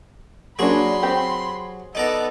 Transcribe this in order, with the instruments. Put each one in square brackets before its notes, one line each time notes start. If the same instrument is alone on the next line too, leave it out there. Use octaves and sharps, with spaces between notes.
[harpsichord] F#3 F#4 G#4 [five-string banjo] A#3 D4 [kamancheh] B5 C6
[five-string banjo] C4 G4
[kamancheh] B3 A4 [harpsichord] D#4 D5 A#5